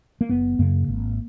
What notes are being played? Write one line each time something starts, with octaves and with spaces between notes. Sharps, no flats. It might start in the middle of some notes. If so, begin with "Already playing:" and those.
A#3
F#1 B3
F#2 C#3 A#3
G#1